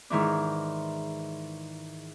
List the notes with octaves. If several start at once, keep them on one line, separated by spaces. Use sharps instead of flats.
G#2 D#3 E3 D4